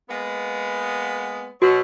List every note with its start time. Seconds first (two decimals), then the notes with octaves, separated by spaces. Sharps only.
0.09 G#3 A#3 B3
1.62 B2 F#3 F#4